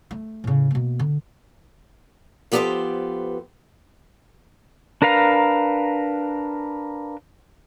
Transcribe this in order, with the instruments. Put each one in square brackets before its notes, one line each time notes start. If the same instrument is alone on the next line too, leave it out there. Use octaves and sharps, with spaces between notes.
[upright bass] A3
A2 C#3
B2 A#3
D3
[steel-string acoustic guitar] F3 B3 G4 A4 B4 C5
[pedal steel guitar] D4 A#4 B4 F5 A#5